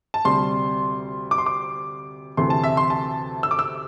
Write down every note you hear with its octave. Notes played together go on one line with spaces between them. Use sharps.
A5
D2 C3 G3 C6
D6
C6
D6
D2 C3 E3 A3 C6
A5
E5
C6
A5
E6
D6
E6